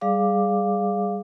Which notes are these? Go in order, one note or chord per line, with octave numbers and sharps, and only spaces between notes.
G3 G#4 D5 F5 D6